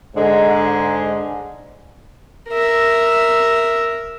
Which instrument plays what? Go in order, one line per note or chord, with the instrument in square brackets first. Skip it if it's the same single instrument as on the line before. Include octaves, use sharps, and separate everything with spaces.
[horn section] G#2 D3 G#3
[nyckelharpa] A#4 E5